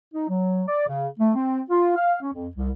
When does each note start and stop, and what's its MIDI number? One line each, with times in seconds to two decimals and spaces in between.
0.14 0.29 63
0.29 0.63 54
0.67 0.83 74
0.87 1.09 49
1.19 1.31 57
1.34 1.60 60
1.70 1.94 65
1.96 2.17 77
2.21 2.32 61
2.33 2.48 41
2.56 2.70 36